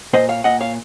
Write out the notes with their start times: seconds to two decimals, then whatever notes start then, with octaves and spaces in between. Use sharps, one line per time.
0.13 A#2 C5 D#5
0.29 C#5 F5
0.44 A#2 D#5 F#5
0.61 C#5 F5